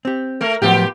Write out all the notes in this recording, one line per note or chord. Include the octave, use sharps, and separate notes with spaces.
C4 G4
A3 A#4
A2 F3 F#3 B3 F4 G4